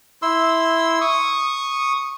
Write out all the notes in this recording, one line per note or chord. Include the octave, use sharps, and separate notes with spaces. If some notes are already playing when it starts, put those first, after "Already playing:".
E4 C6 E6
C#6 D#6